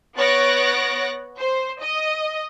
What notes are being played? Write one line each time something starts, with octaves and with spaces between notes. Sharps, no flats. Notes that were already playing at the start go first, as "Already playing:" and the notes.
B3 C#5 F#6 A6 A#6 D7
C5
D#5